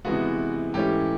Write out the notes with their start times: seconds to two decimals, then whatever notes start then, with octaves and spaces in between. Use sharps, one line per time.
0.05 C3 E3 G#3 B3 F#4
0.74 G#2 E3 A3 C#4 G4